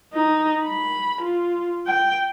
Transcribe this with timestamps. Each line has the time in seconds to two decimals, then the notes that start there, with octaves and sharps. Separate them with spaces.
0.14 D#4
0.64 B5
1.22 F4
1.87 G5